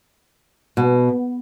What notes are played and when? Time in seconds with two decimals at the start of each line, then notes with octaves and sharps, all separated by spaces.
0.77 B2